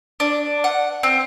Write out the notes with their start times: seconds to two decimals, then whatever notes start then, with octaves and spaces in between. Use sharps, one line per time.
0.20 D4
0.64 F#5
1.03 C4